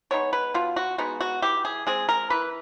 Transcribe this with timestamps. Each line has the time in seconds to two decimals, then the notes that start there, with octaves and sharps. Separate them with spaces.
0.11 G#3 B3 D#4 C#5
0.33 B4
0.54 B2 F4
0.76 F#4
0.98 G#3 B3 D#4 F#4
1.20 F#4
1.42 E3 G4
1.65 G#4
1.87 G#3 C4 G#4
2.09 A#4
2.30 E3 B4